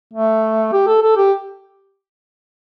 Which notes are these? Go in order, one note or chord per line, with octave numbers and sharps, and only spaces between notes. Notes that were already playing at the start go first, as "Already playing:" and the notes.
A3
G4
A4
A4
G4